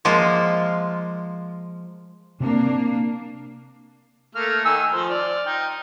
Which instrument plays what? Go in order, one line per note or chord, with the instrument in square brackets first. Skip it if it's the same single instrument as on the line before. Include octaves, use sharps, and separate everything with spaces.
[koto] F3 G#3 A#3 F4
[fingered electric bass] C3 C4 [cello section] A#3 D4
[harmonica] A3 A#3 F6
D#3 G#5 E6
F3 C5
D5 F6
D#4 G5